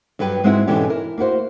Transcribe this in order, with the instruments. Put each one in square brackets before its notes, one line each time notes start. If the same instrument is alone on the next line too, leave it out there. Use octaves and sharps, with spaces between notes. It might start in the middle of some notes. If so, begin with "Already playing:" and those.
[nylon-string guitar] G2 F#3 G4 B4 G5
G#2 G#3 C4 E4 F#4 F#5
G#2 B2 D3 E3 C#4 G4
E4 A#4
A#3 E4 F#4 C5